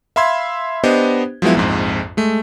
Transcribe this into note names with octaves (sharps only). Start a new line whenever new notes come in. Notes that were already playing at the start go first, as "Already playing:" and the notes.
E5 F5 B5 C6 E6 G#6
B3 D4 G4 C5 D#5
F3 F#3 G#3 B3 E4
A#1 F2 G#2
G#3 A3